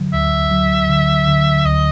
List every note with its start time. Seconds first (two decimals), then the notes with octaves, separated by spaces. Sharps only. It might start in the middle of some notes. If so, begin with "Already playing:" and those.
Already playing: D3 F#3
0.13 D2 E5
0.51 F#3
0.90 D3
1.27 D3
1.65 D2 D#5